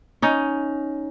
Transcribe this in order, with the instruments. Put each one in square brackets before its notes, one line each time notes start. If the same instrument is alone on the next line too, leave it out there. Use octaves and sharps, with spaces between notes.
[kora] C#4 D#4